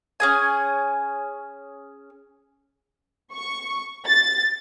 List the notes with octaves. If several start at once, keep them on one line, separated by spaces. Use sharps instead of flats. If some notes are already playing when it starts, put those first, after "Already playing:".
C#4 G#4 G#5
C#6
A6